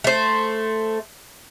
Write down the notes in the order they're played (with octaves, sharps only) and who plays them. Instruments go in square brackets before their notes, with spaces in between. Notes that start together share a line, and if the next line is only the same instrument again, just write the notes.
[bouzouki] A3 C5